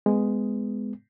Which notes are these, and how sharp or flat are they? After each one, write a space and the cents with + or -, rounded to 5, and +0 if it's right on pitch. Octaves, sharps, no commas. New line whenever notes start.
G#3 +0 B3 +20